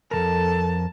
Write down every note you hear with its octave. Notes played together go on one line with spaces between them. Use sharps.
F2 C3 A4 A#4 A5